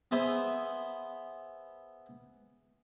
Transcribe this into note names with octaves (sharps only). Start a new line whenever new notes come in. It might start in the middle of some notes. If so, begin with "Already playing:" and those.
B3 G#4 C5 E5